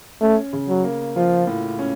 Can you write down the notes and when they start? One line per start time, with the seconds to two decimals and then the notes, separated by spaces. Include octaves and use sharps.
0.21 A3 C#4
0.53 C#3
0.69 F#3
0.84 A#3
1.16 F3 F4
1.47 A2
1.79 C#4